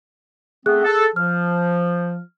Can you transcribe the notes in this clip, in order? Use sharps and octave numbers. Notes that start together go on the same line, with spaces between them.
A3 B3 C4 G#4 F#6
A4
F3 F6